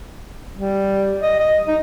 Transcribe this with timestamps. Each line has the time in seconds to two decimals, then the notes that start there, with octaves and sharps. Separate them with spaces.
0.56 G3
1.22 D#5
1.39 D#5
1.67 D#4